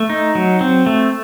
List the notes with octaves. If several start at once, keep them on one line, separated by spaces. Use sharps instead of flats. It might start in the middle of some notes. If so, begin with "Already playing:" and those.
Already playing: A3
D#4
F#3
C4
A3